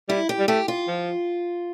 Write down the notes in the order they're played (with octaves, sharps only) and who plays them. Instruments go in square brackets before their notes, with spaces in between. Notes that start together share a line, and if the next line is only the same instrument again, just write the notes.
[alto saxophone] G3 [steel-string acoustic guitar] E4
[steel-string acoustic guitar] G4
[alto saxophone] G3
[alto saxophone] A3 [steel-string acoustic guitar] G4
[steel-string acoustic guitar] F4
[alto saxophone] F3